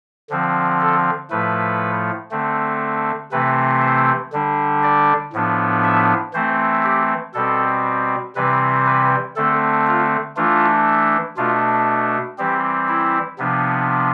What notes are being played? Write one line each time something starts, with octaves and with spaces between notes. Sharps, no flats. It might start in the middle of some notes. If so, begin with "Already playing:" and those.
D3 F3 C4
A4
A2 F3 A3 B4
D3 A3 C4
C3 E3 A3 C4 B4
C5
D3 G3 D4
D5
A2 F3 B3 D4
E5
E3 A3 C4 C5
G4
B2 G3 C4 A4
C3 E3 G3 C4 B4
B4
D3 A3 C4 A4
F4
E3 A3 D4 F4
B2 A3 D4 F4
E3 G3 C4 G4
E4
C3 F3 B3 D4